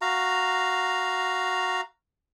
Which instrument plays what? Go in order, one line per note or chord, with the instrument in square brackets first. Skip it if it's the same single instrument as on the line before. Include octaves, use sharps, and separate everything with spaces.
[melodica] F#4 F5 A#5